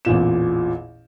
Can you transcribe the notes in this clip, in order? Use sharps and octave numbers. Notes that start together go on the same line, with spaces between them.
A1 E2 A#2 E7